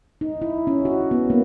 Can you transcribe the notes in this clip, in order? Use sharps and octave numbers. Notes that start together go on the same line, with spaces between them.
D#4
E4
C#4
F#4
B3
A#3